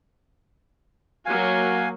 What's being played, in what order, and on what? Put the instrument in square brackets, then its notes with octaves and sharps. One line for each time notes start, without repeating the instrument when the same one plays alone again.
[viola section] F#3 A#3 F#4 [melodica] F5 G#5